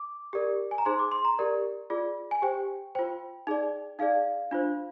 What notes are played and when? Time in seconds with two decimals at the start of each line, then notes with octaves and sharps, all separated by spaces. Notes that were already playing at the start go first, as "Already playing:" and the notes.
Already playing: D6
0.33 G4 A#4 D5
0.71 G#5
0.78 A#5
0.85 D#4 G#4 C5 C6
0.99 D6
1.12 C6
1.25 A#5
1.39 G4 A#4 D5
1.90 F4 G#4 D5
2.31 G#5
2.42 G4 C5 G5
2.95 F4 C5 G5
3.47 D#4 G#4 D5
3.99 D#4 G#4 D5 F5
4.51 D4 F4 C5